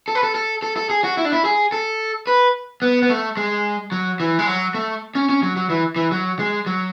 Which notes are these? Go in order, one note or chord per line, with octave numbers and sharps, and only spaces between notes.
A4
B4
A4
A4
A4
A4
G#4
F#4
E4
D4
E4
G#4
A4
B4
B3
B3
A3
G#3
F#3
E3
G#3
F#3
A3
C#4
C#4
F#3
F#3
E3
E3
F#3
G#3
F#3